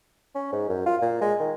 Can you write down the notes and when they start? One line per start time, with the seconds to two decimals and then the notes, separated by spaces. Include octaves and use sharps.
0.35 C#4
0.52 G#2
0.69 F#2
0.86 F4
1.02 A#2
1.21 G#3
1.40 D#3